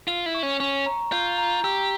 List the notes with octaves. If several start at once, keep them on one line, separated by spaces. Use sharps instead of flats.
F4 E6
E4
C#6
C#4
C#4 C#6
A#5
F4 G6
A#5
G4 E6